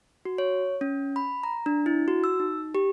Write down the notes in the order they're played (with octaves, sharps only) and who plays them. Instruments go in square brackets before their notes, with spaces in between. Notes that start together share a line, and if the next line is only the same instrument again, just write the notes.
[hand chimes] F#4
C#5
C#4
B5
A#5
D4
E4
F#4
E6
D#4
G4